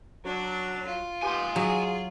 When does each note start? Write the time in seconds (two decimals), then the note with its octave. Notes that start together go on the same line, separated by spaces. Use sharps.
0.25 F#3 D4
0.86 F4
1.23 D#2 B3 G4 G#5 C6
1.56 F#3 G#4